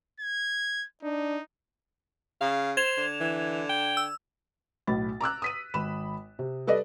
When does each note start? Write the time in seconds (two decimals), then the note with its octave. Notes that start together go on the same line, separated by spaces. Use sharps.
0.20 G#6
1.03 D4 D#4
2.41 C#3 F5
2.77 C5 G#6 E7 F7
2.98 D3
3.21 E3
3.69 G5
3.97 E6
4.87 B1 A2 B5 A6
5.21 A#5 D6 E6 F#6
5.42 D#6 B6 D#7
5.74 G#1 B5 E7
6.39 C3
6.67 G3 A4 B4 D5 D#5